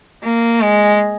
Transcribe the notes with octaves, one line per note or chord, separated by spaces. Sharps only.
A#3
G#3